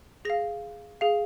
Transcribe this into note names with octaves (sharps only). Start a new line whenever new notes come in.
G#4 F5 A#6
G#4 F5